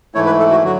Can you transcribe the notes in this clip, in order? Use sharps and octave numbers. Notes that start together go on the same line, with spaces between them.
G#2 E3 A3 E4 C#5
B4
A4
F#4
D3 F#3 F#4